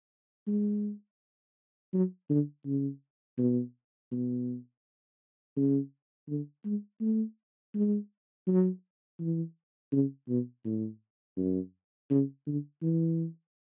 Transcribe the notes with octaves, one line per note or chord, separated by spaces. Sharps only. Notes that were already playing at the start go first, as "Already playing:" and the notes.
G#3
F#3
D3
C#3
B2
B2
C#3
D3
G#3
A3
G#3
F#3
E3
C#3
B2
A2
F#2
C#3
D3
E3